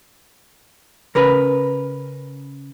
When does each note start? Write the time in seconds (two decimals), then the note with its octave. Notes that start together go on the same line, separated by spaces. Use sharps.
1.15 C#3 A#4 B4